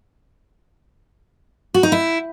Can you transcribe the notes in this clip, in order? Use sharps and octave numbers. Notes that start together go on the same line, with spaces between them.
F#4
D#4
E4